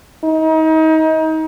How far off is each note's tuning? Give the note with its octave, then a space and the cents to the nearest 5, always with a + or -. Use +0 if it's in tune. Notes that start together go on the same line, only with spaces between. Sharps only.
D#4 +30